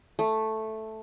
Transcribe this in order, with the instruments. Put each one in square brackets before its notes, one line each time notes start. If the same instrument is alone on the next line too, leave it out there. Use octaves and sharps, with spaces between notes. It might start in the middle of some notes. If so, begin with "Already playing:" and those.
[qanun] A3